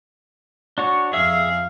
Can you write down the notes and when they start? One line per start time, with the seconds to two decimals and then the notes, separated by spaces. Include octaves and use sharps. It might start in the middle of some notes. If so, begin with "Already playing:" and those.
0.78 D4 F#4 C#5
1.13 F2 G#4 E5 F5 E6